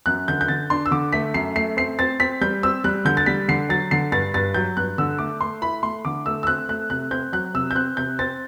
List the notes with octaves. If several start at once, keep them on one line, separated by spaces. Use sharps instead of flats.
F#2 F#6
D3 G6
G6
D3 A6
D4 C6
E6
D3 D6
A3 B6
F#2 C7
A3 C7
C4 C7
C4 A6
C4 B6
G3 G6
C4 E6
G3 F#6
D3 G6
A6
G3 B6
D3 C7
F#3 A6
D3 C7
G2 A6
G2 A6
F#3 G6
G2 F#6
D3 E6
A3 D6
A3 C6
E4 B5
A3 C6
D3 D6
A3 E6
E6
C4 F#6
A3 F#6
C3 F#6
C4 G6
F#3 F#6
C3 E6
G6
C4 F#6
C3 G6
C4 A6